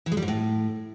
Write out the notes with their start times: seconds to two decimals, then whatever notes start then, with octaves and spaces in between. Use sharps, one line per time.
0.06 E3
0.12 G#3
0.17 G3
0.22 G#2
0.28 A2